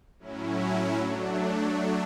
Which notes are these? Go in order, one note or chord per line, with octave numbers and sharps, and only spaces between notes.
A2 F#3 C#4 E4
F#3 A3 D4